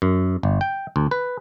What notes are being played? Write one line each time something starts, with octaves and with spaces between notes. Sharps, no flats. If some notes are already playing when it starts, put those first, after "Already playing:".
F#2
G1
G5
D2
B4